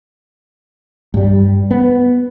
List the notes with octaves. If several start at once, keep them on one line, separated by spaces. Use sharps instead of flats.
G2 G3
B3